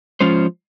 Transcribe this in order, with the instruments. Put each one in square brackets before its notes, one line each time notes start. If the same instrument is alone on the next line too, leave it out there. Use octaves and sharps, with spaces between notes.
[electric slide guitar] F3 G#3 C#4 F4 C5